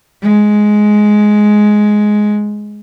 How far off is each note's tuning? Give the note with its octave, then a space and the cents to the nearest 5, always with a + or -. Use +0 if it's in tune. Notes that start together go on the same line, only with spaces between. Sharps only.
G#3 +10